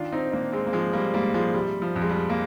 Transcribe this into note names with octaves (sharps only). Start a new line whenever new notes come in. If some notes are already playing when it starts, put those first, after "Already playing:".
Already playing: D#3 D4 F4
C4 D#4
D#3 A#3 D4
G#3 C4
A#3
G#2 F3 G#3
G3 A#3
G#2 G3 A#3
F3 G#3
C3 G3
F3
F2
G#3
G3
A#3